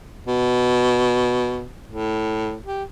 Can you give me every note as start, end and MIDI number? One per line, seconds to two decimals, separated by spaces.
0.27 1.69 47
1.88 2.58 45
2.65 2.83 67